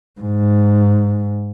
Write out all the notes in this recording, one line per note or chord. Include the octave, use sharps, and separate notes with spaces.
G#2